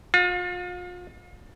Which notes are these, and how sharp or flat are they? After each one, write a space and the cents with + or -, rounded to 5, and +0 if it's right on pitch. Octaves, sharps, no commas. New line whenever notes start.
F4 +40